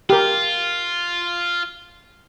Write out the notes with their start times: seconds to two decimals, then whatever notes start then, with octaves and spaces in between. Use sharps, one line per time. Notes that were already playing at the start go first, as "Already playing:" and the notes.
0.10 F4 G4 A#4